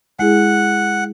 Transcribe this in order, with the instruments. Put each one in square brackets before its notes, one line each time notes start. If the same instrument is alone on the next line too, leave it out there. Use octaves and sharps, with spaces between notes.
[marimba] G#3 E4 G#4 [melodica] F#5